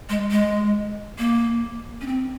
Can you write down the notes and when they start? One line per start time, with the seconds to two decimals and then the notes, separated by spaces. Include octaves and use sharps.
0.09 G#3
0.31 G#3
1.19 A#3
2.01 C#4
2.07 C4